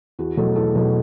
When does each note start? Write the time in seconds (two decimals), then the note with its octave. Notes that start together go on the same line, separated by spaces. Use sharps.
0.19 E2 F#4
0.37 B2 F#3 A3 A4
0.56 E2 A4
0.75 B2 F#3 A3 F#4